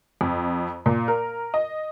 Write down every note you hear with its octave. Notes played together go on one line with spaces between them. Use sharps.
F2
A#2
A#4
D#5